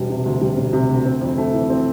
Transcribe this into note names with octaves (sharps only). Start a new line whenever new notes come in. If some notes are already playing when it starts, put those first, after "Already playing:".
Already playing: E1 G3
C3
D2
G3
E1
C3
D2
C4
F2
A3
E3
C4